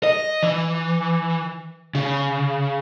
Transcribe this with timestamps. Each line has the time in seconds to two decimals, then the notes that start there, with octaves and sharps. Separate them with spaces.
0.03 D#5
0.43 E3
1.95 C#3